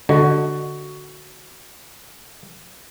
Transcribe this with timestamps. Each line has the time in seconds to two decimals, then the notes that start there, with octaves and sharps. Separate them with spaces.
0.09 D3 F#4 D#5